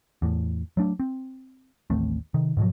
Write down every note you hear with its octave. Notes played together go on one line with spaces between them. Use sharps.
E2 A2
F#3 A3 D4
C4
A1 D#2 A3 C4
C3 D#3
G#2 B2 F3 F#3